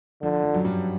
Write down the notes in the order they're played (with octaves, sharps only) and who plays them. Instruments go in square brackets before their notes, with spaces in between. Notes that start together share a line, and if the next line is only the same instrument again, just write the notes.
[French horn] D3 [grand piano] F3
[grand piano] F3
F#2 F#3
G2 G3